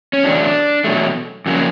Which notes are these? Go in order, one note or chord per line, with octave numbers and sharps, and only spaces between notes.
C#4
E2 B2 F#3 A3 D4
E2 B2 F#3 A3
F2 C#3 F#3 A#3